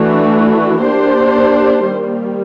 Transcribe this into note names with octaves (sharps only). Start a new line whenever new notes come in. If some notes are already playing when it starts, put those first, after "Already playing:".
Already playing: E3 A3 D4 F#4
A#3 D4 G4 C5
D#3 G3 A#3